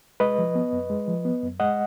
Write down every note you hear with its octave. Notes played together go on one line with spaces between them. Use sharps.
G#3 B4 D#5
F3
B3
F#2
G#3
F3
B3
F#2
G#3 D#5 F#5